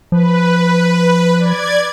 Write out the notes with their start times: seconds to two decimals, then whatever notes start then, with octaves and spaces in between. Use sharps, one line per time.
0.12 F3 B4
1.38 D5 G#6